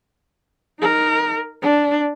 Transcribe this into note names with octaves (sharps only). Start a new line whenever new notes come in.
D#4 A#4
D4